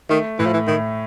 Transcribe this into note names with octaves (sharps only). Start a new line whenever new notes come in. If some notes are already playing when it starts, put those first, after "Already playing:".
D#3 A3
A2 E3
F3
E3
A2 D#3